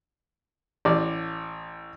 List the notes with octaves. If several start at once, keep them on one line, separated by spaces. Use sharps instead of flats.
A1 D5